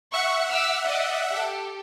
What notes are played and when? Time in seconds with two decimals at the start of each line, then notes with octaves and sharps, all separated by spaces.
0.14 E5 F#5 C#6
0.50 D6 E6 F6
0.87 D5 D#5
1.31 G4 A4